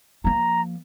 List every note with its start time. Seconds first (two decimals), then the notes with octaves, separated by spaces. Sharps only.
0.24 F3 A#3 A#5